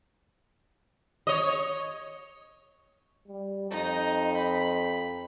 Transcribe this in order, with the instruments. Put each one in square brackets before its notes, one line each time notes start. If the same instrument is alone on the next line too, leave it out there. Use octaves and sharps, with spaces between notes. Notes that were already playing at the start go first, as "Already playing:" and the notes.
[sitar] C#5 D#5
[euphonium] G3
[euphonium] F2 [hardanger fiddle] D#4
[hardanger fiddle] B5